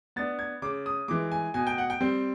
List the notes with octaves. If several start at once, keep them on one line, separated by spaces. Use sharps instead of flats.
B3 D4 A6
G#6
C#3 D6
D#6
E3 G#3 D6
G#5
B2 G#5
G5
F#5
G5
G3 C4